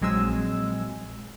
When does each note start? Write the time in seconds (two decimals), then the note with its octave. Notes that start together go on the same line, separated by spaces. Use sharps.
0.01 A#1 F#3 G#3 C4 G#5 E6